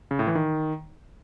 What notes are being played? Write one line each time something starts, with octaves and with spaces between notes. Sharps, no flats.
C#3
A2
E3
D#3